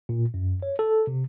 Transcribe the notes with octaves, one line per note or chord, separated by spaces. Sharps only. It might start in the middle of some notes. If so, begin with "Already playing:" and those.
A#2
F#2
C#5
A4
C3